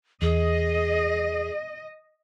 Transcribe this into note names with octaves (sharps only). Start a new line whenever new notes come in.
E2 G#4 D#5